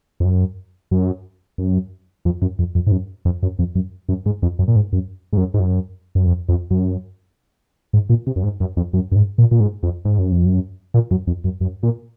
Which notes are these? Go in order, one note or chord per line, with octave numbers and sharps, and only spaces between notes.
F2
F#2
F#2
F#2
F2
F#2
F2
F2
G#2
F#2
F2
F#2
F2
F#2
F#2
G#2
F2
F#2
A#2
G#2
F#2
G#2
F#2
G#2
F#2
F#2
F2
F2
F#2
G#2
A#2
C3
F#2
G#2
F#2
F2
F#2
F#2
G#2
A#2
A#2
G#2
F2
G#2
F#2
F2
F#2
A#2
F#2
F2
F#2
F#2
A#2